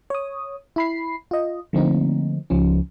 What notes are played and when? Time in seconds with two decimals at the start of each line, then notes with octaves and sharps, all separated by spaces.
0.10 C#5 D#6
0.76 E4 B5 C7
1.31 F4 D#5
1.73 D3 F3 A3 A#3 C4 D#4
2.50 C#2 F3 C#4